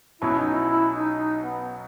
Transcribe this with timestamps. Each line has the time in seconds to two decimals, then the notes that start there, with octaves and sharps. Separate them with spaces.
0.22 B1 B2 F#3 C#4 E4
0.38 D#4
0.54 E4
0.69 E4
0.93 D#4
1.17 D#4
1.41 B3